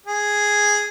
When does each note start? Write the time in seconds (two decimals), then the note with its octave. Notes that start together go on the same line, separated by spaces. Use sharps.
0.06 G#4